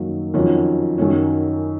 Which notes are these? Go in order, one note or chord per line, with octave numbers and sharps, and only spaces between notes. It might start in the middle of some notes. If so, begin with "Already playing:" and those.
Already playing: F#2 D#3 F#3 A#3
F2 D#3 F#3 C#4
F#2 D#3 F#3 C#4